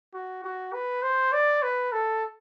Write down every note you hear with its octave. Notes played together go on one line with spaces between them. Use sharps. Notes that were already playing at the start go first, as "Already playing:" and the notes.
F#4
F#4
B4
C5
D5
B4
A4